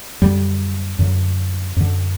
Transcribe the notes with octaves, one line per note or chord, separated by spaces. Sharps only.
F#2 D3 G3
F#2 D3
F#2 D3